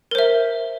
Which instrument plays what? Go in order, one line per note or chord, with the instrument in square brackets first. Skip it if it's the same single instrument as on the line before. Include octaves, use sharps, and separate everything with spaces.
[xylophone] A#4
C5
E5